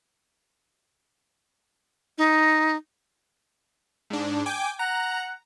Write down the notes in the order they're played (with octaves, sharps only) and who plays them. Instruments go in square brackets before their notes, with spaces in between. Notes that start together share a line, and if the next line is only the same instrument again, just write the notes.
[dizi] D#4
[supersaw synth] G#2 D4
G5 G#5 D6
[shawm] F#5 [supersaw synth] A#5